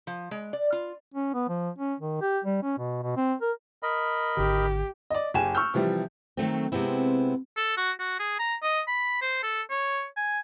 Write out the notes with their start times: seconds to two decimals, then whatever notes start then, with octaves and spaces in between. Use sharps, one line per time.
0.07 F3
0.31 G#3
0.53 D5
0.72 F4
1.14 C#4
1.34 B3
1.49 F3
1.78 C#4
2.00 D#3
2.21 G4
2.44 G3
2.63 C#4
2.79 B2
3.03 B2
3.16 C4
3.41 A#4
3.83 A#4 D#5 B5
4.37 G#1 D3 G4
5.10 D5 D#5
5.34 F#1 G4 G#5 E7
5.55 C#6 E6 F6 G6
5.74 C3 E3 F3 G3
6.37 D#3 F#3 A3 C4
6.72 C3 G#3 B3 C4 E4
7.57 A4
7.77 F#4
7.99 F#4
8.19 G#4
8.39 A#5
8.63 D#5
8.87 B5
9.21 C5
9.43 A4
9.70 C#5
10.17 G#5